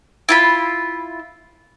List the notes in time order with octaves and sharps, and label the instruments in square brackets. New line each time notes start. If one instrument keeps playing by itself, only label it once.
[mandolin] E4 F4 B5